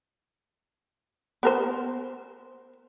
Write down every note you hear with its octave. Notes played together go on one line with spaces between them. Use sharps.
B3 A#4 C5